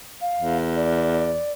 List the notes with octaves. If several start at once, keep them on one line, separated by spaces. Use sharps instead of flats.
F5
E2
D5